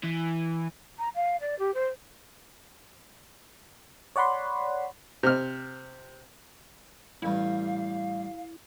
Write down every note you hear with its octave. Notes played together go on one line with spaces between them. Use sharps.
E3
A#5
F5
D5
G4
C5
C#5 D5 F#5 B5 C6
C3 F6
A1 G2 E4 F5